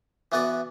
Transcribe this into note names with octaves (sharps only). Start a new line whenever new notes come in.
E3 B3 F#4 B4 D5